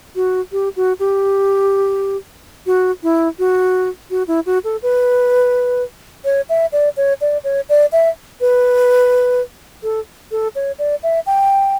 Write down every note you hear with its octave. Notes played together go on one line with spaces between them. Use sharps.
F#4
G4
F#4
G4
F#4
E4
F#4
F#4
E4
F#4
A4
B4
C#5
E5
D5
C#5
D5
C#5
D5
E5
B4
A4
A4
C#5
D5
E5
G5